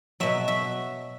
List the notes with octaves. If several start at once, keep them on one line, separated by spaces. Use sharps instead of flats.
B2 F#3 E5
E5